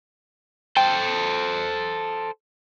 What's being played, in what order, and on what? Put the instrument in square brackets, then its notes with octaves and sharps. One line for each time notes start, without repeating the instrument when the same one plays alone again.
[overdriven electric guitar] A4 C5 [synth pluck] G5